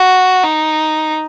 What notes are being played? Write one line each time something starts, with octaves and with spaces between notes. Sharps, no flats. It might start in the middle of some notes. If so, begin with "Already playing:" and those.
Already playing: F#4
D#4